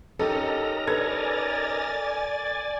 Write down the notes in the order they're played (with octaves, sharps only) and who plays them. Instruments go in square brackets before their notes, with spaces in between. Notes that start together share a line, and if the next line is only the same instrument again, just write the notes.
[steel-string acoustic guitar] C#4 D#4 G4 [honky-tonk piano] A4 [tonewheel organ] A#4 D#5 A#5
[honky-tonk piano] A4 B4 G#6 [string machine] D5 G#5 A6